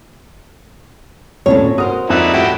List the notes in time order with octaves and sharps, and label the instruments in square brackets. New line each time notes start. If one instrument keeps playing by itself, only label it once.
[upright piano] D#1 C3 C#4 [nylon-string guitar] A2 D4 C#5
[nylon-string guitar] F#4 A#4 C5 [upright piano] D#6
[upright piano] F2 E5 F#6 [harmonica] D#4 E4 D5
[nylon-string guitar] A2 G5 [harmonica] E4 F#4 G4